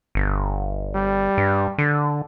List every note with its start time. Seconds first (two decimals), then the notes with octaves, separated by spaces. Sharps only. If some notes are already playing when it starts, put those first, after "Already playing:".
0.15 G1
0.95 G3
1.38 G2
1.78 D3